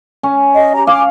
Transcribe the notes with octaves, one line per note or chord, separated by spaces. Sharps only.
C#4
D#5
G4 A#5
F5 G#5 D6